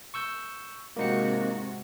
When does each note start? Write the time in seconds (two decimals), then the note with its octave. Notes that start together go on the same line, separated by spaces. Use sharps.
0.14 C#6 E6 G6
0.96 G#2 C3 A#3 D#4 F#4 C#7